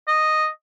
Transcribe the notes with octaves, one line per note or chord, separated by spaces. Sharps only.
D#5